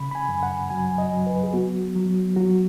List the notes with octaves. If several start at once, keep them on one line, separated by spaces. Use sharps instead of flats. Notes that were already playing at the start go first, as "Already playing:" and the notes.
Already playing: C#3 B5
B5
G#5
F#2
F#5
F#3 G#5
D#5
F#3
B4
G#4
B3 F#4
F#3
F#3 F#4